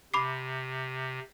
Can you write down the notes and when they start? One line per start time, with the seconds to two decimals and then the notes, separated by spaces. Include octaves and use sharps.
0.14 C3 B5 D6 C7